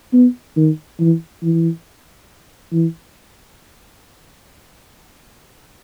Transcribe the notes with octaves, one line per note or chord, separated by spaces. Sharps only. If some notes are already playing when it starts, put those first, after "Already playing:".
B3
D#3
E3
E3
E3